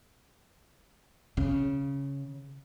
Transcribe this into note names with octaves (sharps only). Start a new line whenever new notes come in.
C#3